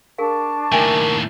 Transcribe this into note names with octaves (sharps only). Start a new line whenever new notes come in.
D4 G#4 A#4 F5 A5 C#6
D#2 A2 A#4 E5 G5 G#5